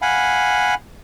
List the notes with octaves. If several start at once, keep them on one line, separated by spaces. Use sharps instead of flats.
F5 F#5 G#5 B5